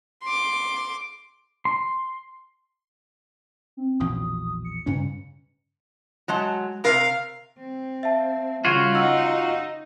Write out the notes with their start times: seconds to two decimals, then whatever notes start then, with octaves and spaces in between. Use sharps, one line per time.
0.23 C6 D6
1.65 C6
3.77 C4
4.00 A#1 E2 B2 D#6
4.65 C#7
4.86 G2 C#3 C#4
6.28 F#3 G#3 A5
6.84 C3 A#4 F5
7.60 C4
8.03 E5 F5 A5
8.65 C#3 G3 F4 F#4 G#6
8.95 D#4 F#5 E6